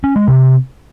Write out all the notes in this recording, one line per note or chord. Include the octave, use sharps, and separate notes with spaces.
C#4
G#3
C3